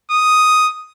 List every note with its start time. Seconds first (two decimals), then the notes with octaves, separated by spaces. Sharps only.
0.11 D#6